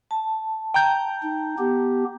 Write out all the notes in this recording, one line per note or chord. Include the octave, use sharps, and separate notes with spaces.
A5
G5 A#5 G6
D#4
B3 G4